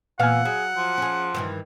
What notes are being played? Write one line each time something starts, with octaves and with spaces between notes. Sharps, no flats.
A#2 E3 B3 F5 F#5 G#5
F#3 G#4
F3
C#4 G#4
G2 D#3 E3